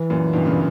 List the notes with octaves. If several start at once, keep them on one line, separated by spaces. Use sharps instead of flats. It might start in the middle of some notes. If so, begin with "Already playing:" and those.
Already playing: E3
F#2 A#2
G2 B2
A#2 C#3